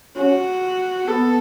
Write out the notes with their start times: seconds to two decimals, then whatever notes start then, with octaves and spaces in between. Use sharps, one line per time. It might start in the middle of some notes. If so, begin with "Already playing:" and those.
0.16 C#4 F#4
1.07 B3 A4